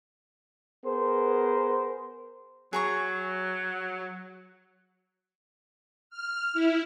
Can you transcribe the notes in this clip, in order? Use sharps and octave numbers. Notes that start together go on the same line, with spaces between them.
B3 G#4 A#4 C5
F#3 G#4 A#5 C#6
F6
E4